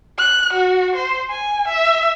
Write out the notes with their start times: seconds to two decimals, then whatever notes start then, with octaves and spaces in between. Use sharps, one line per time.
0.18 F#6
0.53 F#4
0.95 C5
1.30 G#5
1.67 E5